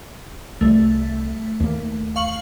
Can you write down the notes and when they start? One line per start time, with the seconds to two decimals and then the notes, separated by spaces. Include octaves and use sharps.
0.61 C2 G3 A3
1.60 D#2 A#3
2.16 F5 C#6 F#7